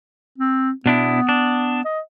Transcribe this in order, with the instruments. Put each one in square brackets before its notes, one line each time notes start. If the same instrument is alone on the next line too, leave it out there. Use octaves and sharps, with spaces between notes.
[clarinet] C4
[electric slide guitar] B2 D4 E4 [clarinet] B3
[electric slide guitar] D4
[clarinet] D#5